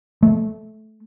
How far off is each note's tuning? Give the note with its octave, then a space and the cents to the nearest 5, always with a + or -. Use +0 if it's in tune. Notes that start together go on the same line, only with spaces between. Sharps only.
A3 -15